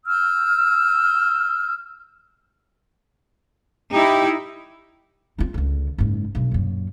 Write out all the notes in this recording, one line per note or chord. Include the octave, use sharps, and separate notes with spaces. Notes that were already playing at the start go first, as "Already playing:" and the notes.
E6 F6 G6
D#4 E4 G4
C4 F4
C#2 D3
F#1 G#2
B1 D4
F#2 A#2